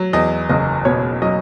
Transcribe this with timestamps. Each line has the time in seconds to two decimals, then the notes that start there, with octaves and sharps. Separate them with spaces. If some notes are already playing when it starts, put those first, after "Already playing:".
Already playing: F#3
0.13 E2 D#5
0.49 F#1 D#5
0.85 B2 C#5
1.22 F#3 D#5